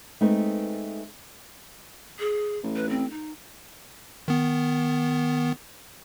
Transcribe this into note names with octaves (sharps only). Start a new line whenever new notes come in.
G#3 A3 C4 D#4 B4
G#4
A1
B4
C4
D#4
D#3 B3